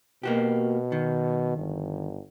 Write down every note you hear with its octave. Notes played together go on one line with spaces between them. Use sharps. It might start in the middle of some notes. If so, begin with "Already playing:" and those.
B2 A#3 F#4 G4
D#3
G1